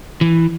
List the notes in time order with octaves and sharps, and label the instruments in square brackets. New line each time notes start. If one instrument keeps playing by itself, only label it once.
[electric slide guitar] E3